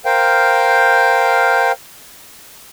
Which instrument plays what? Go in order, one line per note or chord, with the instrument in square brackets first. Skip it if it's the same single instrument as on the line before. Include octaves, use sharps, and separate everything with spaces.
[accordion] A#4 C5 F5 G5